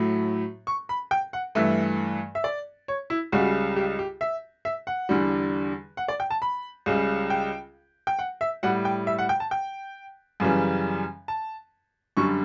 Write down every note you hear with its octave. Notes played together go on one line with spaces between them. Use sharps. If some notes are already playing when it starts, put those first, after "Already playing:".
Already playing: A2 F#3 A3
C#6
B5
G5
F#5
G2 E3 A3 E5
E5
D5
C#5
E4
C#2 C#3 G3 F#4
G4
G4
E5
E5
F#5
E2 D3 G3
F#5
D5
G5
A5
B5
C#2 C#3 G3
G5
G5
F#5
E5
A2 G3 F#5
G5
E5
F#5
G5
A5
G5
F#2 C#3 E3 G3
A5
F#2 D3 G3 C#6